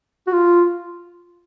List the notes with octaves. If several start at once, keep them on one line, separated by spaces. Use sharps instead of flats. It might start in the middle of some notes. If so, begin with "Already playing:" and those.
F#4
F4